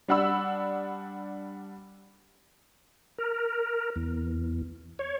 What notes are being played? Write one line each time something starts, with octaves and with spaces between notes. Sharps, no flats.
G3 D4 F#5 B5 E6
A#4
E2
C#5